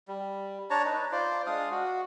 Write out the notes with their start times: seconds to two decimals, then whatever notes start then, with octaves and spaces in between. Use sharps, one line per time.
0.08 G3
0.70 D4 C#5 A5 A#5
0.85 D#4 B4
1.12 F4 C5 D5
1.46 G#3 D4 F5 D#6
1.71 F#4